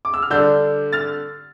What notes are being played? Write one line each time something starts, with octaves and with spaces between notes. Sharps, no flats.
D6
E6
F6
D3 G3 D4 E6 G6
F6 A6